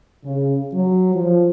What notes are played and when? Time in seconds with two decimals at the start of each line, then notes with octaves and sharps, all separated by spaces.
0.25 C#3
0.74 F#3
1.15 F3